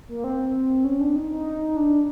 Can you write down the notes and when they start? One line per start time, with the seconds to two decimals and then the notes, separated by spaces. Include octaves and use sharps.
0.09 A#3
0.24 C4
0.84 C#4
1.00 D4
1.16 D#4
1.31 D#4
1.77 D4